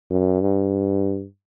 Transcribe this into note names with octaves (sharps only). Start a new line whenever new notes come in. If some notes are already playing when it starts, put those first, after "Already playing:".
F#2
G2